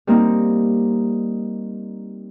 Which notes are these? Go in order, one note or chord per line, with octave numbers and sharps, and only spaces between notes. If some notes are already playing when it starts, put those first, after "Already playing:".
G3 A#3 C4 D#4